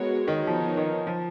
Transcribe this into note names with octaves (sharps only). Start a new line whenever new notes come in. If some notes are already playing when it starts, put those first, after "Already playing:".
Already playing: G#3 B3 F#4 A#4 C#5
D#3
F3 B3 D#4 A#4 C#5
D#3
F3